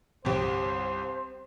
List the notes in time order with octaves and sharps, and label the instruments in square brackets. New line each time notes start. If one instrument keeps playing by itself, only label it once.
[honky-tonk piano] G1 C2 [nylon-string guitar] C4 G4 [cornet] C5